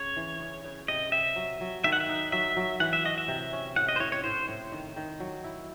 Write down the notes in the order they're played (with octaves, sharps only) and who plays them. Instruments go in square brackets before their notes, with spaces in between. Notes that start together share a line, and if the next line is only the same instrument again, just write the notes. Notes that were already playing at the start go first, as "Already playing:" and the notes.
Already playing: [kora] C#3 [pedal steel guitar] C#5
[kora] E3
C#3
C#3
[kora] C3 [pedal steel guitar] D#5
[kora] C3 [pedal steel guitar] E5
[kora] F#3
F#3
[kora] D#3 [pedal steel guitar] E5
[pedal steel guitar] F#5
E5
[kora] D#4
[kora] F#3 [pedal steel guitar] E5
[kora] F#3
[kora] E3 [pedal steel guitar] F#5
[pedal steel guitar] E5
[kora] F#4 [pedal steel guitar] D#5
[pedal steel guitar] E5
[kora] C3
C#4
[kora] A2 [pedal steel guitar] F#5
[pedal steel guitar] D#5
C5
[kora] A2 [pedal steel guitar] C#5
[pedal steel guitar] C#5
[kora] A2 [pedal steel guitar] C5
[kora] A2
D#3
D#3
F#3
E4